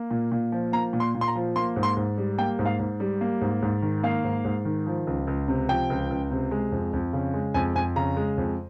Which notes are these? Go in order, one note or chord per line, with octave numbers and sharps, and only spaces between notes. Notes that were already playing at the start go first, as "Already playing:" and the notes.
Already playing: A#3
A#2
A#2
F3
A#3 A#5
A#2
C6
A#2
C6
A#5
F3
A#3 C6
G#2
C6
G#2
G3
A#3 G5
G#2
F5
G#2
G3
A#3
G#2
G#2
D#3
A#3 F5
G#2
G#2
D#3
F3
C#2
C#2
C3
F3 G5
C#2
C#2
C3
G#3
F2
F2
C#3
G#3
F2 G#5
F2 G#5
C#3 A#5
G#3
F2